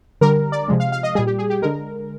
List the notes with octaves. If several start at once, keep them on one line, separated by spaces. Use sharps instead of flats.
D3 G3 A#4
D5
C3 F3 G#3
F5
F5
D#5
A#2 G3 G#4
G4
G#4
G4
D3 G#3 A#4